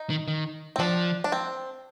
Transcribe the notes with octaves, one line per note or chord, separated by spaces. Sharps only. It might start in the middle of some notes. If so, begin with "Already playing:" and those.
Already playing: D#4
D#3
D#3
C4
F3 D4
D4
C4